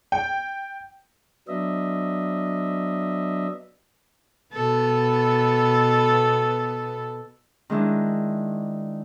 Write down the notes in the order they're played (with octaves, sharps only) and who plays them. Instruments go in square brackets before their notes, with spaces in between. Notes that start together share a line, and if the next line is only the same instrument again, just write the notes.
[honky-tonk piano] G5
[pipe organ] F#3 B3 D4 D#5 E5
[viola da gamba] B2 B3 A4
[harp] D#3 G#3 D4 E4